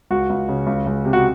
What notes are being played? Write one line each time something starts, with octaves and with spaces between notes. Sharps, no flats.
C#2 F#4
C#2
C#3
C#2
C#2
C3
F#4